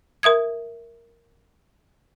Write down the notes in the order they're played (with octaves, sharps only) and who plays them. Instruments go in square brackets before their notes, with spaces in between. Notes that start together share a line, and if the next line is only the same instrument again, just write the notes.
[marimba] A#4 E5 D#6 G#6